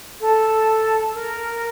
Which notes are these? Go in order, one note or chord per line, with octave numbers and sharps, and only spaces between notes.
A4
A#4